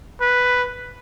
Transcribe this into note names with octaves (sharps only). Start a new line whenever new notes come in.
B4